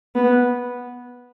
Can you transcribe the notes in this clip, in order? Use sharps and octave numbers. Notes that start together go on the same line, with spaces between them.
B3